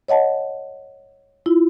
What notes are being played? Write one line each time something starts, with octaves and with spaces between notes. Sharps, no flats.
C#5 D#5 F#5 A5
E4 F4